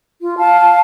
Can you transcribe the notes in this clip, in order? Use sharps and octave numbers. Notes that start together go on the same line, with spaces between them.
F4
F5 A5